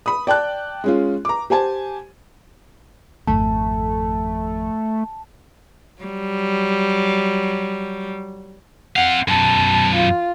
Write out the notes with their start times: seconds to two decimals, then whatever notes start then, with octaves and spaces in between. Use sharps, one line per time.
0.06 B5 D#6
0.27 D5 G5 A5 F#6
0.84 G#3 C#4 F4
1.25 A#5 D6
1.50 G4 C5 G#5 A5
3.27 G#1 F2 A3 A5
6.02 F#3 G3
8.96 C4 F5 F#5
9.28 F#2 B2 A5
9.94 F4